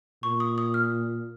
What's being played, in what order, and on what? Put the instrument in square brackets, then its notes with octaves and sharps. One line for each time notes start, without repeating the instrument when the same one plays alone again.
[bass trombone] A#2 [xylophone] C#6
[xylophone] D#6
D#6
F6